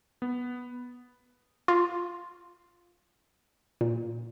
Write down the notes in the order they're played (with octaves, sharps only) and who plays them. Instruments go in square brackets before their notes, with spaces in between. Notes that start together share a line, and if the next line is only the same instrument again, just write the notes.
[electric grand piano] B3
[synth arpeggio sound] F4
A#2